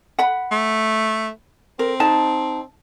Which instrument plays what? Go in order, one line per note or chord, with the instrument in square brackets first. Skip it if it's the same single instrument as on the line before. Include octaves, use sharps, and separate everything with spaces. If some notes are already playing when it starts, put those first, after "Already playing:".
[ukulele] F#5 B5
[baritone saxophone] A3
[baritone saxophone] C4 [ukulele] A#4
[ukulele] D#4 A5